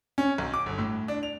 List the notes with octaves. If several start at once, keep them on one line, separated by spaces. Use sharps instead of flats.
C#4
B1
D6
G1
A2
D4
F7